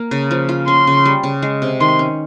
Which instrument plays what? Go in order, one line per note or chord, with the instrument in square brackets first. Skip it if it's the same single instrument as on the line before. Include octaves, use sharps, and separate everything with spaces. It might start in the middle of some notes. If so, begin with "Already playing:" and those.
Already playing: [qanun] A#3
C#3
F3
F4
[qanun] C#4 [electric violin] C6
[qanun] C#3
G3
C#3
G#3
C3
[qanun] D#3 [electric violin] C6
[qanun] C#4